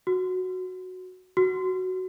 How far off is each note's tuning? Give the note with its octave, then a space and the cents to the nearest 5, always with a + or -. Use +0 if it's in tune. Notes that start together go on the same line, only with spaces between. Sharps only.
F#4 -5
F#4 +5